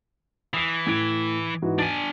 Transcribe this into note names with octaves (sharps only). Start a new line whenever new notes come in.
E3 D#6 C7
A2 G#6 D7
G#2 E3 F#4
D4 G#5 A6 D7